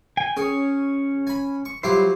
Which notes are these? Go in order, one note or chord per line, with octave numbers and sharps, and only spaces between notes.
G5 G#5
C#4 G#4 C#5
G#5 B5
C#6
F#3 G3 E4 F4 G4 C5